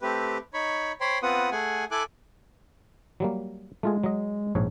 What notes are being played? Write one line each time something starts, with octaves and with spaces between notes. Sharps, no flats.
A3 C4 G4 B4
D#4 C#5 B5 C#6
C5 C#5 G5 B5 C6
B3 C4 F4 B4 F#5 D#6
A3 G#4 F#5 G#5
E4 A4 G#5 D6 F#6
F#3 G3 A#3
G#3 A3 F4 G#4
F#3 D#5
A#1 G#2 C#5